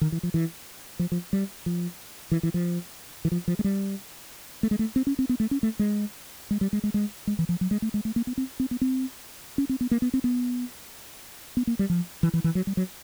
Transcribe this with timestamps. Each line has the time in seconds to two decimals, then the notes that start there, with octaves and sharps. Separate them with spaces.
0.01 D#3
0.12 E3
0.23 F3
0.34 E3
0.99 F3
1.12 F3
1.33 G3
1.66 F3
2.31 E3
2.43 E3
2.54 F3
3.25 E3
3.32 F3
3.48 F3
3.59 G#3
3.64 G3
4.63 A3
4.71 G#3
4.79 A3
4.96 C4
5.07 C#4
5.19 C4
5.29 B3
5.40 A3
5.51 C#4
5.63 A3
5.79 G#3
6.51 G#3
6.61 G3
6.73 G#3
6.84 G#3
6.94 G#3
7.27 G#3
7.39 E3
7.49 F3
7.61 F#3
7.71 G#3
7.82 A3
7.94 G#3
8.05 A3
8.16 A#3
8.27 B3
8.38 C4
8.60 C4
8.71 B3
8.81 C4
9.58 C#4
9.69 C4
9.81 B3
9.91 A#3
10.02 B3
10.14 C4
10.24 B3
11.57 B3
11.67 A#3
11.79 G3
11.90 F3
12.23 E3
12.34 E3
12.44 E3
12.55 F#3
12.67 G3
12.77 F#3